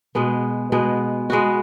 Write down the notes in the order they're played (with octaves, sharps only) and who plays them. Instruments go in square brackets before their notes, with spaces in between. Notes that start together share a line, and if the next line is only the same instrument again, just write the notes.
[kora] B2 G#3 B3
B2 G#3 B3
G#3 B3 F#4